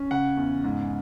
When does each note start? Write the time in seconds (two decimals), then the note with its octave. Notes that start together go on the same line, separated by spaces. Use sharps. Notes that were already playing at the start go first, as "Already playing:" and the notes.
Already playing: C#4
0.11 C#3 F#5
0.37 E2
0.64 G#2